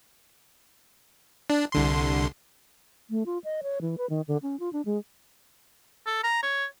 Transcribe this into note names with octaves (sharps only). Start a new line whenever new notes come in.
D4
C2 D3 C6
A3
F4
D#5
C#5
E3
B4
D#3
D3
C#4
F4
D4
G#3
A4
A#5
C#5